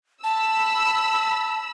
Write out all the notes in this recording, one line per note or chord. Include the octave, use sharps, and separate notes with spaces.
A5 B5 E6